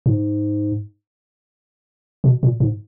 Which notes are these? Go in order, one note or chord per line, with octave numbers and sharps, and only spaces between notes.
G#2
B2
A#2
G#2